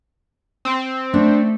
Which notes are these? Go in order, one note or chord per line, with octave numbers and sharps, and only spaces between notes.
C4
A3 D4